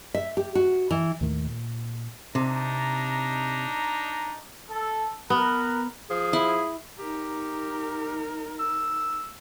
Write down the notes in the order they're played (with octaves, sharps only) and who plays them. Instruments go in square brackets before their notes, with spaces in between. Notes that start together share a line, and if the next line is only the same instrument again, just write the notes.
[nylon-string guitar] E5
G4
F#4
E3
[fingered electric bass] D#2 A2 D#3 A3
A#2
[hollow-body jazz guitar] C3 [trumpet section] D4 D#4 A#5
[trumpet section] A4
[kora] B3 [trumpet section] A#4 B4 A#5
[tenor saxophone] F3 [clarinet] G#4
[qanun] E4
[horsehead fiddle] D#4 A#4 [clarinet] G4
[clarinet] E6